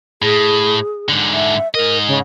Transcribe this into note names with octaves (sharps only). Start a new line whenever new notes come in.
A2 G#4
G#2 D3
E5
G#2 A#4 D#5
C#3